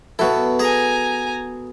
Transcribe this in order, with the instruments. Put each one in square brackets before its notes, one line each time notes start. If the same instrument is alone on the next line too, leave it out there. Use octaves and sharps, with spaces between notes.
[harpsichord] B2 E4 [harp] B3 F#4 A4
[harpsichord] G#4 [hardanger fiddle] G#5 A#5